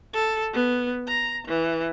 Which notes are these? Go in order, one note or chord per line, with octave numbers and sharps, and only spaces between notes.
A4
B3
A#5
E3